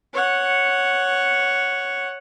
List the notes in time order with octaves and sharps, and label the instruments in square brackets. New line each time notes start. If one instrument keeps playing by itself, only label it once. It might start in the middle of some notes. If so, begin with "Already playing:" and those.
[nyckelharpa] C#5 F#5